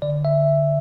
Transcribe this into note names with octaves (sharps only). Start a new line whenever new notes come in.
D3 D5
E5